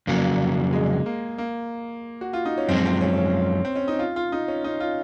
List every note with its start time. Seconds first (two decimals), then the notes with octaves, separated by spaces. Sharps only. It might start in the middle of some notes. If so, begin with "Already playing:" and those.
0.07 F2 C#3 F#3 A#3
0.73 G#3
1.06 A#3
1.38 A#3
2.21 F#4
2.33 F4
2.45 D#4
2.58 C#4
2.69 F#2 F3 G#3 C4
2.86 C4
3.01 C#4
3.18 C#4
3.65 C4
3.76 C#4
3.88 D#4
3.99 F4
4.16 F4
4.32 D#4
4.48 C#4
4.64 D#4
4.80 F4